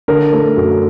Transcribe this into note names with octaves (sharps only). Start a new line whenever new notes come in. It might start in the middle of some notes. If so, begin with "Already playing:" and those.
D3 A#4
A3
F#2